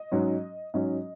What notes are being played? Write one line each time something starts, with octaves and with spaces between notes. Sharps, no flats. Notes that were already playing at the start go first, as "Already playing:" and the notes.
Already playing: D#5
G#2 F#3 C#4
G#2 F#3 C#4 D#5